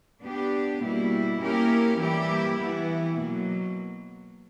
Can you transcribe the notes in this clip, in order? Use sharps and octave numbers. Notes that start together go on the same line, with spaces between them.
B3 D4 G4
B2 G3 A#3 E4
A#3 C#4 E4 G4 A#4
E3 G3 A#3 E4 G4
E3 B3 E4
B2 F#3 A#3